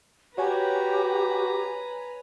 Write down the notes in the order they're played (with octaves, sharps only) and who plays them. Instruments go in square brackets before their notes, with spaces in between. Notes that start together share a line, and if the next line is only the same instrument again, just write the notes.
[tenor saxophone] F#4 [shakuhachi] G4 [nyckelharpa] B4 A#5 [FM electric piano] C#5 G#5